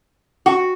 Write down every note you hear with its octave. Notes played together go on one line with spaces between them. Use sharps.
F#4